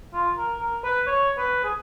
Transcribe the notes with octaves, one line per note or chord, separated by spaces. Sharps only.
F4
A#4
A#4
B4
C#5
B4
G#4